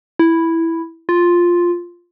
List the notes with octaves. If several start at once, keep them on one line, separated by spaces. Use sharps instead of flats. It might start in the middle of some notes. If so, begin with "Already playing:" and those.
E4
F4